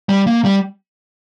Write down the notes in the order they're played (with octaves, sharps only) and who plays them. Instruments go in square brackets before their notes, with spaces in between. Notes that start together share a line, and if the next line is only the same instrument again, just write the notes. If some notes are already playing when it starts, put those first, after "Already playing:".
[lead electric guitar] G3
A#3
G3